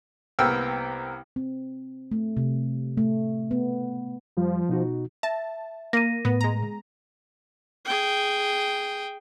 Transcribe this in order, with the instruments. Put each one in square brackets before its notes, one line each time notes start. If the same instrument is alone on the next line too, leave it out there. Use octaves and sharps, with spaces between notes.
[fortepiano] C2 A#3 B3 G5 E6 F6
[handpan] C4
A3
C3
A3
B3
[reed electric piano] F2 G3 [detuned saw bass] F3
[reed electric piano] B2 D#4 F#4
[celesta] E5 [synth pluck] A5
[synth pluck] A#3 [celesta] A#6 D#7
[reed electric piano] A2 [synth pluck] B3
[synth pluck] G#3 A#5
[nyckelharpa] G#4 G5